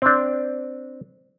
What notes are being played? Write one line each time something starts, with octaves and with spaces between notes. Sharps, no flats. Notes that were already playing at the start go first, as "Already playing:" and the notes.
C4 D4